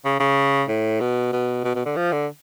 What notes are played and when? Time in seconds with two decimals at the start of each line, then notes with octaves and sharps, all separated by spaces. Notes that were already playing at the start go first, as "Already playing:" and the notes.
0.05 C#3
0.20 C#3
0.68 A2
1.00 B2
1.33 B2
1.64 B2
1.75 B2
1.86 D3
1.96 F3
2.12 D3